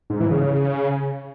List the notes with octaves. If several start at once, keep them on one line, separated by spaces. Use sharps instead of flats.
G#2
E3
C#3
C#3